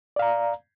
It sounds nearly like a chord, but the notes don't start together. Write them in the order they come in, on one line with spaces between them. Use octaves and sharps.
D5 F5 A#5